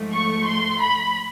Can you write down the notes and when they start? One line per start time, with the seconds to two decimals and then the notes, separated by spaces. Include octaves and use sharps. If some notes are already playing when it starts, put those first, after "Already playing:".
Already playing: G#2 F3 A3
0.13 C#6
0.47 C6
0.81 B5